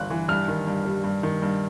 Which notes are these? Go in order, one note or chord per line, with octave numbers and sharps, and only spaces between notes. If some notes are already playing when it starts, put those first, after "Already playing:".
Already playing: G1 G2 E3 F#6
E3
G2 F6
D#3
G2
G3
G2
D#3
G2